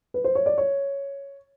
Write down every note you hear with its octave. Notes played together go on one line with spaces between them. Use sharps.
B4
C5
C#5
D5
C#5